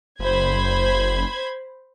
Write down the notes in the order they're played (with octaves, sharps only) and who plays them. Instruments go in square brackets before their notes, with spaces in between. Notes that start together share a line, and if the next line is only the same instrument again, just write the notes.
[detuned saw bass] F#1 [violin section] C5 B5 G#6